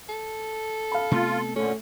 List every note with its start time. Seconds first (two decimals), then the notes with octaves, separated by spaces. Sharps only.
0.09 A4
0.92 F5 B5
1.11 C3 A3 B3 F4
1.56 A#2 D3 A3 C#4